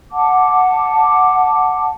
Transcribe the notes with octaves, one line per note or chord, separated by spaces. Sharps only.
F#5 A5 D6